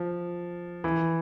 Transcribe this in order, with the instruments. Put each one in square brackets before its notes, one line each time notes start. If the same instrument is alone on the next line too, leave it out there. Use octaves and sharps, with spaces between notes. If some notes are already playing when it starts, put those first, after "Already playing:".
Already playing: [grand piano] F3
E3